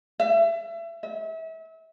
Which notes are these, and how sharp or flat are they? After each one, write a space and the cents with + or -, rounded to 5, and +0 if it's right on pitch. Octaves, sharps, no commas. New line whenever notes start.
E5 +30
E5 -30